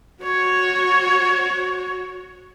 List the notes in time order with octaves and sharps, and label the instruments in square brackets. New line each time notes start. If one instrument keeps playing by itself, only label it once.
[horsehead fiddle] F#4 C#5